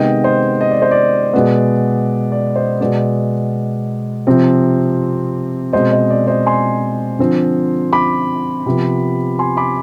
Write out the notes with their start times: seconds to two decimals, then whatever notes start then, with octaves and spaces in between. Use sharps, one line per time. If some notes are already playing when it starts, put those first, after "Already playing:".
Already playing: C3 D#3 G#3 B3 D#5 G5
0.24 C5 D#5
0.61 D#5
0.71 D5
0.82 C5
0.91 D5
1.33 B2 G#3 B3
2.32 D5
2.56 C5 D#5
2.80 B2 G#3 B3 D5
4.27 C3 F3 C4
5.73 B2 G#3 C4 C5 D#5
5.91 C5 D#5
6.10 D5
6.27 C5 D#5
6.46 G#5 C6
7.19 D3 F3 C4
7.93 B5 D6
8.66 C3 F3 B3
9.39 G#5 C6
9.57 B5 D6